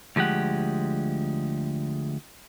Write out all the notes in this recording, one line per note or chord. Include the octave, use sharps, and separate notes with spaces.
D2 F3 G#3 G4 F#5